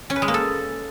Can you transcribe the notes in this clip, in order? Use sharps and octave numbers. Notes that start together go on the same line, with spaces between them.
C#4
B4
G#3
A#3
A4